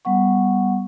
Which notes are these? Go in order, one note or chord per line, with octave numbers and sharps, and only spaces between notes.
G3 B3 F#5 C#6